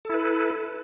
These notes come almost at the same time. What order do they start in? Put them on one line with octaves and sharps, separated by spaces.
A4 E4 B4